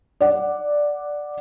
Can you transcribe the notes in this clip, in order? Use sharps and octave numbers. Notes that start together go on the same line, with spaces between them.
D5 F#5